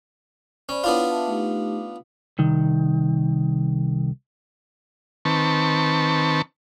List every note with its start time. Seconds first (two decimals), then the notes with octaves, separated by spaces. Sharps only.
0.69 C#4 C5 D5 B5
0.84 B3 D4 E4 F4 C#5
1.09 E5 A5 D6
1.27 A3 D#4 G4
2.39 C2 D#3
5.25 D#3 C4 B4 A5 C#6